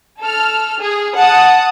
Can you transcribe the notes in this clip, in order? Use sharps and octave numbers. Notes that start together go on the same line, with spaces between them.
A4 F6
G#4
F#5 A5 D#6